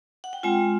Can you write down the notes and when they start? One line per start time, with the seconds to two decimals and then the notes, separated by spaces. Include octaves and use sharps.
0.24 F#5
0.33 G5
0.43 G#3 C4 F4 G#5